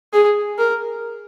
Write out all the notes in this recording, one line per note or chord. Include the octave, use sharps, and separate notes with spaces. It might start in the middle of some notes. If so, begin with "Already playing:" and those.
G#4
A#4